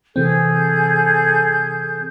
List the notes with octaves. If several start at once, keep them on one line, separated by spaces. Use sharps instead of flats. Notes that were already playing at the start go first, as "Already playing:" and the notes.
C3 E3 C4 G#4 A4 G6